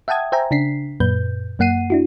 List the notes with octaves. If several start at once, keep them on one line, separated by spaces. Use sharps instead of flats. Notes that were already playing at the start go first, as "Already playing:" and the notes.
E5 F#5 G5 A5 D#6 G#6
C5 E5 G5 G#5 A#5
C#3 D4 B6 C7
F#2 A#2 B4 G6
F#2 A#3 F#5 C7 D#7
D4 E4 F#4